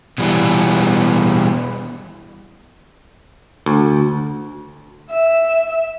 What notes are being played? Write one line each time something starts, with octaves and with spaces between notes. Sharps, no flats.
B2 E3 G3 A#3 B3
D2
E5